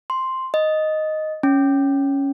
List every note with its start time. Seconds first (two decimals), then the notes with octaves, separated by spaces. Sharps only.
0.10 C6
0.54 D#5
1.43 C#4